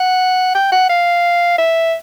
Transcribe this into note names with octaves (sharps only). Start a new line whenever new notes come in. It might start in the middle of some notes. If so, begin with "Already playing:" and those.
Already playing: F#5
G5
F#5
F5
E5